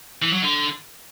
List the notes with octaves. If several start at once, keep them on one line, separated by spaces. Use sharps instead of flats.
E3
F#3
D3